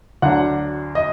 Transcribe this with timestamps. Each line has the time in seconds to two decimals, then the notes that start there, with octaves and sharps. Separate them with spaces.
0.22 D2 D3 F#3 D4 F#5
0.95 D#5